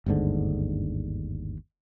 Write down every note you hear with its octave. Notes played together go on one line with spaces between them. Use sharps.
G1 D#2 G#2 D3